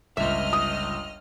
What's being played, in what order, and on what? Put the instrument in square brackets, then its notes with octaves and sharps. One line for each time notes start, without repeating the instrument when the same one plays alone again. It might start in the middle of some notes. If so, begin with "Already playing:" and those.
[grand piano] G1 C#2 [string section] D#5 F6 [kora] E5
[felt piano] D#6